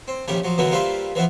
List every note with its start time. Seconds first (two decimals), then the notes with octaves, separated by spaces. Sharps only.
0.08 C4
0.28 A#1 D#3 C#4 E4 G4
0.44 F3 F#3
0.58 B2 D3 E3 F#3 A#3 B3
0.72 G3 A#3 F4 B4 C5 E5
1.15 E3 F3 B3 E4